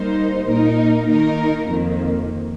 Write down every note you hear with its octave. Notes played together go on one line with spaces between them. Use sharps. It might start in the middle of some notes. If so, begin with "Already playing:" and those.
Already playing: G3 A#3 D#4 C5
A#2 A#3 D#4 A#4
D#3 A#3 D#4 A#4
F2 D#3 A#3